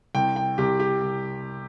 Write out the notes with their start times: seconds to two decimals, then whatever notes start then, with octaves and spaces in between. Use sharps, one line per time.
0.15 C2 G5
0.36 G5
0.58 C2 G4
0.80 G4
1.01 C2